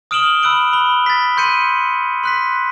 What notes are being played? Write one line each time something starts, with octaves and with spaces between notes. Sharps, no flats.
D#6 F6 D7 E7 F#7 G7
B5 E6 F#6 D7 F#7
B5 G7
A6 B6
C6 G6 C#7 D#7
C6 F#6 B6